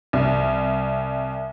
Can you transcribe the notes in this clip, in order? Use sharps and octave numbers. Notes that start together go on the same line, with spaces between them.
C2